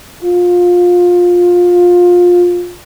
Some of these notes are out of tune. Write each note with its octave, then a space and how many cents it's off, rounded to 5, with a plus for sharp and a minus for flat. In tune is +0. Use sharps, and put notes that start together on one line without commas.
F4 +20